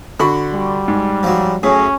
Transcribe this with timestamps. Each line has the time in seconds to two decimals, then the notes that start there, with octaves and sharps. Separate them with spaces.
0.20 D3 F#4 B5 C#6
0.53 G3
0.88 G#2
1.23 F3 F#3
1.63 F#2 A2 C#4 G#4